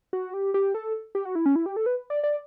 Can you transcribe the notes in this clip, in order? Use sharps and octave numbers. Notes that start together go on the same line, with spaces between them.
F#4
G4
G4
A4
G4
F#4
E4
C#4
E4
G4
A4
B4
D5
D5